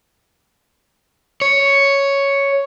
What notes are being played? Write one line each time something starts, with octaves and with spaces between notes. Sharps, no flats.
C#5